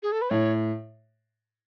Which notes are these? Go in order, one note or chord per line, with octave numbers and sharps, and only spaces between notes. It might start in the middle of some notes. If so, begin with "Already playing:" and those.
G#4
A4
B4
A2 C#5